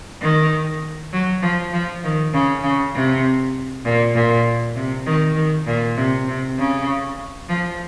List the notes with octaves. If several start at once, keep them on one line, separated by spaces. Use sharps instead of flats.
D#3
F#3
F3
F3
D#3
C#3
C#3
C3
A#2
A#2
C3
D#3
D#3
A#2
C3
C3
C#3
F3